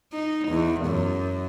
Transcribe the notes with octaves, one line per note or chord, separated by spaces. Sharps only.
D#4
E2
F#2